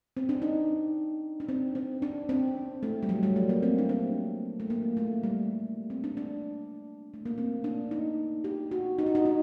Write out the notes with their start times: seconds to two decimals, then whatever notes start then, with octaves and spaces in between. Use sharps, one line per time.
0.17 C4
0.29 D4
0.42 D#4
1.40 D4
1.49 C4
1.75 C4
2.02 D4
2.29 C4
2.83 A3
3.03 G3
3.09 F#3
3.23 G3
3.36 A3
3.49 A#3
3.63 C4
3.78 D4
3.89 C4
4.60 A3
4.70 A#3
4.97 A3
5.23 G3
5.90 C4
6.04 D4
6.17 D4
7.14 A3
7.26 A#3
7.38 C4
7.64 D4
7.91 D#4
8.44 G4
8.71 F#4
8.98 D#4
9.06 F#4
9.15 D#4
9.25 D#4